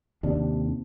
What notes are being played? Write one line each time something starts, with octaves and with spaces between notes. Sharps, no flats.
D#2 C3 D4